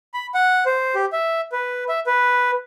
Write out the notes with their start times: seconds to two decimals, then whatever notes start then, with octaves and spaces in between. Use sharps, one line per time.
0.14 B5
0.34 F#5
0.66 C5
0.95 G4
1.12 E5
1.52 B4
1.89 E5
2.06 B4